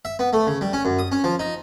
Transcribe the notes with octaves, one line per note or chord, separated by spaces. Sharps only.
E5
B3
A3
C#3
G3
C#4
F#2
D#6
C#4
F3
D#4